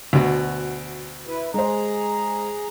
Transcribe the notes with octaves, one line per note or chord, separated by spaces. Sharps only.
D2 B2
E4 B4
G#3 G#4 C5 A#5